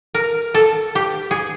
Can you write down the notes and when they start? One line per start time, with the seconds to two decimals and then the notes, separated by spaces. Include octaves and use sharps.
0.15 A#4
0.54 A4
0.95 G4
1.31 G#4